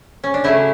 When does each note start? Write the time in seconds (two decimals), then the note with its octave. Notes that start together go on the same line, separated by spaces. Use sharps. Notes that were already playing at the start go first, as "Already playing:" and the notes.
0.24 C#4
0.34 D4
0.44 C#3 F#3 A3 E4